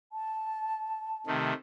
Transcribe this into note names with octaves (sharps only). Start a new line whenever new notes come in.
A5
C3 D#3 A3